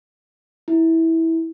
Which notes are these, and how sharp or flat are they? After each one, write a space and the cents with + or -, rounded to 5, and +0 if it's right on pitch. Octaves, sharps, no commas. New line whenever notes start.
E4 -15